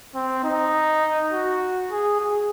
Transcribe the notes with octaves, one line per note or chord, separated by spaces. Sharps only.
C4
D#4
F#4
G#4
G#4